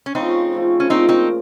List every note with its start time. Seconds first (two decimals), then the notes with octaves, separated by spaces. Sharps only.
0.06 C#4
0.15 C#3 F3 A3 C4 D#4
0.53 C#3 F3 A3
0.80 C#4
0.90 A#2 F3 A3 C4 D#4
1.09 C4 D#4